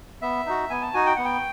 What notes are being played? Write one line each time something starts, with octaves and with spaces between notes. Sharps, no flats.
B3 E5
D#4 F#4
B3 G#5
A5
D#4 F#4 G#5
G5
B3 F#5
G5